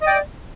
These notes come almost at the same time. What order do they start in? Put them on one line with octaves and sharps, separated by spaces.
D#5 D5 G5